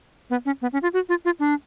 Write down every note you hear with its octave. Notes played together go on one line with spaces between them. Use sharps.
B3
C#4
B3
C#4
F4
F#4
F4
F4
D4